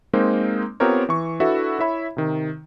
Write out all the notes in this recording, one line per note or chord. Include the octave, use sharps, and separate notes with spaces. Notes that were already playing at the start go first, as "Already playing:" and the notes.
G#3 A#3 C4 D#4 A#4 C5
B3 C4 F4 G4 A#4 C#5
E3 C#6
D4 E4 F#4 A4 B4 E5
E4 C#5 E5 B5
C3 D#3